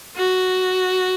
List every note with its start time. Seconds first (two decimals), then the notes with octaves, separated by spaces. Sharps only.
0.16 F#4